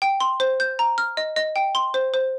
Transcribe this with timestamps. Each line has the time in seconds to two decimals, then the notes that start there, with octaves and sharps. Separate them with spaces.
0.02 G5
0.20 C6
0.40 C5
0.60 G6
0.79 A#5
0.98 F6
1.17 D#5
1.36 D#5
1.56 G5
1.75 C6
1.94 C5
2.14 C5